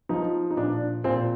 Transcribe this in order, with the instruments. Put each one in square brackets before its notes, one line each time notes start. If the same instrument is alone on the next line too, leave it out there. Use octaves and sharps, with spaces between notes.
[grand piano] F3 D#4
D#4
A#2 D4
A#2 C4